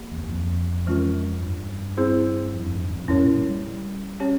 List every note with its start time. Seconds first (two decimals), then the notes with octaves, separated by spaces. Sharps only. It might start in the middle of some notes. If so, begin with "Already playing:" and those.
Already playing: A#3 G4
0.12 E2
0.23 E2
0.30 F2
0.86 E3 G#3 C#4 F4 A#4
1.42 G2
1.97 C4 E4 G#4 C5
2.53 F2
2.62 G2
2.67 F2
2.74 G#2
2.81 G2
2.90 E2
2.95 F2
3.05 A#2
3.08 G#2 C#4 E4 A#4 C#5
3.23 A#2
3.37 G3
3.50 G3
4.20 C#4 G4 C#5